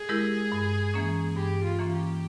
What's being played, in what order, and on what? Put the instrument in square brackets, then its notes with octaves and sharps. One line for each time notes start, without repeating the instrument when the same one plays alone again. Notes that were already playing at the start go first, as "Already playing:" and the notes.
Already playing: [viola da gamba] G#4
[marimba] G#3 E4 G4 A#4
G2
E3 A#3 C#4
[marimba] G2 [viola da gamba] G4
[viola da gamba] F4
[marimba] E3 A#3 C#4
[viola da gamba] G4